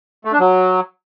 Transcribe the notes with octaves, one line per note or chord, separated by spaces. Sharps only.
A3
D4
F#3